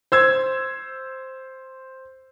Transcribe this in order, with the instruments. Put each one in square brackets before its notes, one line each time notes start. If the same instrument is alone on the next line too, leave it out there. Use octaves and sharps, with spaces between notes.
[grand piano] C5 E6 G#6